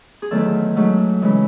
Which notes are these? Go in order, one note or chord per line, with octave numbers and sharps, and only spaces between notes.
G#4
E2 D#3 F#3 A3 A4
G#2 F#3 A3
C#3 E3 G#3